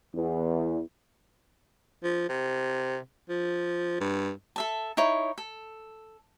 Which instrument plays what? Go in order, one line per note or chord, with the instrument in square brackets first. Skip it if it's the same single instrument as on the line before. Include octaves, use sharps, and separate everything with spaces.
[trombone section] E2
[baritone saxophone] F3
C3
F3
G2
[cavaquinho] A4 E5 A5
D#4 E4 C#5
A4